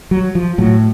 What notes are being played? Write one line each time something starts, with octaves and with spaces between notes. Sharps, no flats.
F#3
F3
A2 F#3